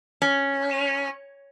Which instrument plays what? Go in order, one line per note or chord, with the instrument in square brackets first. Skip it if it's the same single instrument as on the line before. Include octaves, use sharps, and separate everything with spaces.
[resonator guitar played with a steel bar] C#4